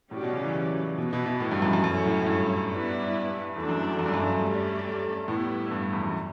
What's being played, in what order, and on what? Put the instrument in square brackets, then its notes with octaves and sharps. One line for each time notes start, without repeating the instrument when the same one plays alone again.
[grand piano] A2 [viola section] F#3 C#4 G4 D5
[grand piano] B2
C#3
E3
E3
[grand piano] B2 [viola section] E3 B3 E4 B4
[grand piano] B2
B2
A2
G2
F#2
F#2
[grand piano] F#2 [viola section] F#3 C#4 E4 A4 C#5
[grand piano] A2
G2
[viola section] G3 B3 E4 B4 D5
[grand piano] E2 [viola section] A3 D4 F#4 A4 D5
[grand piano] F#2
E2
F#2
G2
F#2
G2
[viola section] A3 C#4 G4 D5
[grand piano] A2 [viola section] G3 B3 E4
[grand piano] G2
E2
F#2